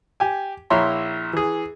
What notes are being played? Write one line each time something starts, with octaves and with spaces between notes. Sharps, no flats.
G4 G#5
A#1 E4 C#5 E5 A#5 C6
E3 G#4